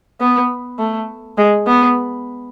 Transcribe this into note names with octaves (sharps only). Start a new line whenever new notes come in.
B3
A3
G#3
B3